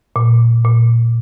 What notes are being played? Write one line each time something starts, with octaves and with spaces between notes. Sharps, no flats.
A#2
A#2